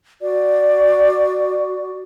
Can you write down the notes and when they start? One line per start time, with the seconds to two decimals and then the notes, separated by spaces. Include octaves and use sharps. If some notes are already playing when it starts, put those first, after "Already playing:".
0.22 F#4 D5